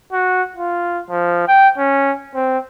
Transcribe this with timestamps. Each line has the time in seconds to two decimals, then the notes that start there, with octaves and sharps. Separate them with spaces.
0.12 F#4
0.56 F4
1.10 F3
1.48 G5
1.78 C#4
2.35 C4